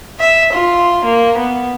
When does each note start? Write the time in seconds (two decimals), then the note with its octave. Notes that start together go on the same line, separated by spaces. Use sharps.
0.19 E5
0.54 F4
1.04 A#3
1.38 B3